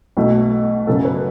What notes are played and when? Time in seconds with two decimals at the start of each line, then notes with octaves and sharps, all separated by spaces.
0.17 B1 B2 A3
0.87 F#2 C#3 F#3 B3 A4
1.05 B4